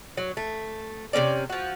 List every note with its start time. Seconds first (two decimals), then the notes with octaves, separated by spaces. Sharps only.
0.17 F#3
0.37 A3
1.13 C3 G3 C#4 D5
1.50 F3 F#4